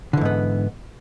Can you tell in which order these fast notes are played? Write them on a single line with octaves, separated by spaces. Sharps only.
D3 E3 G#2 B3